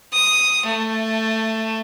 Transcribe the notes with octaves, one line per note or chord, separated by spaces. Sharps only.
D#6
A3